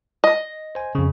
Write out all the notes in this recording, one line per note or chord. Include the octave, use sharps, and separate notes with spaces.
D#5
C5 G#5
F2 C#3